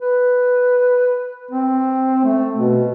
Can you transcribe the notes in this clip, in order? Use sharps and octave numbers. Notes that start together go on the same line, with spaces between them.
B4
C4
A3
B2